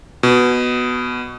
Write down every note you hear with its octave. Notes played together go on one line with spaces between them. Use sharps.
B2